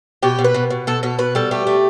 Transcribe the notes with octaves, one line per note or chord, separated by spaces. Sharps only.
B2 G4
B2
B4
B2
B2
B2 A4
B2 A4
B2 B4
G3 A4
A3 G4
A3